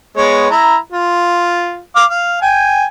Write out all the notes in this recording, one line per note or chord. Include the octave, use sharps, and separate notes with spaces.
G#3 B3 C#5
E4 A#5
F4
F5 D6
F5
G5 G#5